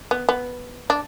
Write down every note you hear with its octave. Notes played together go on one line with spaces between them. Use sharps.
B3
B3
D4